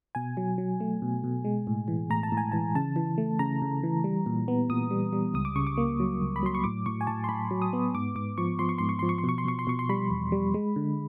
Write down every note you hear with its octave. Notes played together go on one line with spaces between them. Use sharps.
B2 G#5
F#3
F#3
A3
B2
B2
G#3
A2
E3
A2 A#5
A5
A2
G#5
E3 A5
C#3 A5
E3
A3
C#3 A#5
C#3
E3
G3
A#2
B3
A#2 D#6
G3
G3
C#2 D#6
D6
C#3 C#6
D6
A#3
F#3
C#2
B5
F#3 C6
C#6
A2 D6
A2 C#6
G#5
A2 A5
C6
A2 B5
F#3
D#6
B3
G#2 D6
G#2 D6
F3 C#6
F3 C6
C#6
G#2 C6
C#6
F3 C6
C#6
C6
B2 C#6
C6
B2 C#6
C6
B2 C#6
C6
G3 B5
E2
G3
G#3
D3